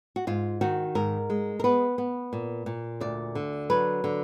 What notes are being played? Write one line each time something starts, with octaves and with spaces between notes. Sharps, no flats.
F#4
G#2 F4
D#3 F#4
G#2 A#4
G#3
A#4
B3 B4
B3
A#2
A#2
D2 D5
D3
F#3 B4
D3